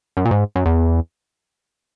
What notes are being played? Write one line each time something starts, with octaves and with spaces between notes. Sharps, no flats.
F#2
A#2
G#2
F#2
E2